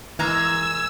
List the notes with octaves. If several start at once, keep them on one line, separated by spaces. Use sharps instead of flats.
E3 G#3 A#3 A#5 E6 G#6